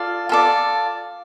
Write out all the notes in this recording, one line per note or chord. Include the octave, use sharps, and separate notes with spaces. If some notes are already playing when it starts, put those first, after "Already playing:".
Already playing: F4 A4 D5 F5
F4 A4 D5